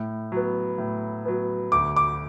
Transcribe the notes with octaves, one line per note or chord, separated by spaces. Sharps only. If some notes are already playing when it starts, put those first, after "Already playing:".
Already playing: A2
F#3 B3
A2
F#3 B3
D2 D6
D6